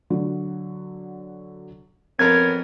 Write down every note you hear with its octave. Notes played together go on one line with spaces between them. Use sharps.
D3 F#3
F2 F3 B3 C#4 A4 A#4 G#6